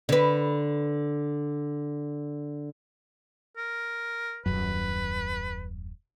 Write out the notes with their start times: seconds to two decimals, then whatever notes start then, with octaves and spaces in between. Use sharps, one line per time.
0.09 D3 B4
3.57 A#4
4.46 D#1 F#2 B4